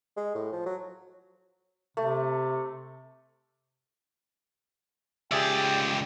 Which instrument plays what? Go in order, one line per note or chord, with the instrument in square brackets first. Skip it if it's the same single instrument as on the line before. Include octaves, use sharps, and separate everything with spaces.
[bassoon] G#3
A2
F3
F#3
[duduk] C3 [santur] A3
[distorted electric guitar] C#2 D5 [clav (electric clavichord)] G4 G#4 E5 [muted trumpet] G5